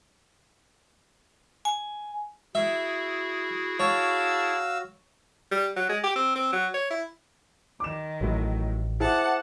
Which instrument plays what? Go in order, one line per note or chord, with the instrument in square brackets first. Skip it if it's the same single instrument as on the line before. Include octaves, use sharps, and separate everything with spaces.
[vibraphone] G#5
[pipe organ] E4 G#4 [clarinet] F#4 [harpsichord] E5
[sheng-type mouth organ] F#4 F5 E6 [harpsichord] C#5 [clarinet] A5
[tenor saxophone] G3
F#3
G#3
G4
C4
C4
F#3
C#5
E4
[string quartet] D#3 [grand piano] D6 E7
[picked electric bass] A1 [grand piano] A2 F#3
[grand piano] E4 G#4 [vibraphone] C5 E5 D6 [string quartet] F#5 A5